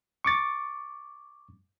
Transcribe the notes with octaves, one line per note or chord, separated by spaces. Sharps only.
C#6 D6 A6